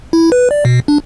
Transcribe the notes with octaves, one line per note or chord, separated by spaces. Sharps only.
E4
B4
D5
B2
D4